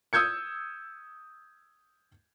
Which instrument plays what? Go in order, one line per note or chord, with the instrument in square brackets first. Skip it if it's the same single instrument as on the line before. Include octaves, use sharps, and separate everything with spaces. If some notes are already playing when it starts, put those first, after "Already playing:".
[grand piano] D#6 E6 G6 G#6 C#7